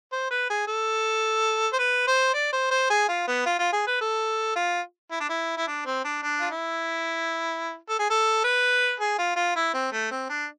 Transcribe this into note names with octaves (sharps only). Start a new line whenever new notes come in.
C5
B4
G#4
A4
C5
B4
C5
D5
C5
C5
G#4
F4
B3
F4
F4
G#4
B4
A4
F4
E4
D4
E4
E4
D4
C4
D4
D4
F4
E4
A4
G#4
A4
B4
G#4
F4
F4
E4
C4
A3
C4
D4